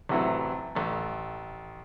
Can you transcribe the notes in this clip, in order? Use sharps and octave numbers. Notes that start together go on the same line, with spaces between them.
A1 C3 E3 F#3 A3 E4
A1 A3